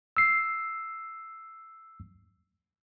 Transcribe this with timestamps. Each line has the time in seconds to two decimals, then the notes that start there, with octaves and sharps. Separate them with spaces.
0.17 E6 C7